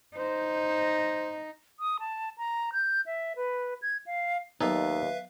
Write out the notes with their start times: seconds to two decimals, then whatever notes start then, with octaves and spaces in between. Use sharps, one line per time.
0.17 D#4 C5
1.80 D#6
2.00 A5
2.38 A#5
2.73 G6
3.06 E5
3.36 B4
3.82 G#6
4.06 F5
4.60 D#2 F#3 B3 D#4 A4 B4 E5 F5